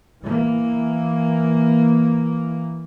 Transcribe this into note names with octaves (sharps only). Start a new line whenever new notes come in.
E3 A#3